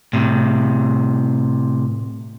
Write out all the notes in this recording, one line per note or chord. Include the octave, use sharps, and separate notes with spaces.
A2 C3